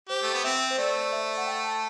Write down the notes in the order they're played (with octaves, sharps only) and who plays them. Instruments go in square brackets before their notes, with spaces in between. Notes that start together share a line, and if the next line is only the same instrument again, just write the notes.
[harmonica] G4 [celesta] C5
[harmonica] A3
B3
[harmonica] C4 [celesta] E5
[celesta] C5
[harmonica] A3 [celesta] D5
[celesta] E5
F#5
G5
A5